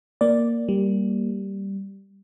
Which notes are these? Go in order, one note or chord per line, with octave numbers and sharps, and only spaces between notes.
A#3 D5
G3